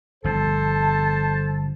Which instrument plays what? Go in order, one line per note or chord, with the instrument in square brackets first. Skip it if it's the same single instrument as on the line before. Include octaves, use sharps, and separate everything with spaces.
[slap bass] G1 F3 [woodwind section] A4 C5 A5